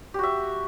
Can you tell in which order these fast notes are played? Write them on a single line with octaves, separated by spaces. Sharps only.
G4 F#4 E5